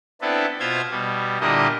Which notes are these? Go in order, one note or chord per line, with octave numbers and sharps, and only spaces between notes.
B3 C4 D4 E4 A4 B4
B2 F4 C5 E5 F5 G#6
B2 G3
A#2 D3 G3 A#3 E4 D#5